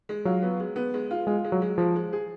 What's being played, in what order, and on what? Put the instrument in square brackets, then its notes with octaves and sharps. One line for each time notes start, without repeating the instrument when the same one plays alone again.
[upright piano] G#3
[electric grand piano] F#3 [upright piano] F4
[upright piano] B3
G#3
B3
G#3
F4
[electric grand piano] G#3 [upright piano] F4
[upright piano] G#3
[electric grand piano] F#3
[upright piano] G#3
[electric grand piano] F3 [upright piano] G#3
[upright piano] G#3
G#4